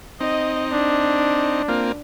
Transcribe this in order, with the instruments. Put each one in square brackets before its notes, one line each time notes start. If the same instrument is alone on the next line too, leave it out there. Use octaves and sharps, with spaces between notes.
[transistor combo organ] C4 D#4 [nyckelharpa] D#5
[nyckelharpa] D4
[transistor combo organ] A#3 C4 F4